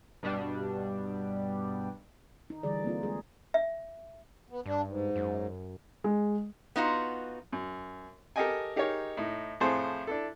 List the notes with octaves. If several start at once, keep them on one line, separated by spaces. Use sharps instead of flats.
G2 B2 G3 D4
D#4
D3 E3 G3 G#4 D5
A#3 C4 D#4 F4
G#3 G#4
E5
B3
G2 D4
G#2
F#2
G#3
B3 D#4 F4 F#4
F#2
G4 A4 A#4 D#5 G5 G#5
D#4 G4 G#4 A#4 C#5
A2 D#4
F2 A2 G#4 A4 C5
D4 E4 A4